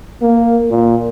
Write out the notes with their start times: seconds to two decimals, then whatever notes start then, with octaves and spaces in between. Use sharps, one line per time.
0.22 A#3
0.71 A#2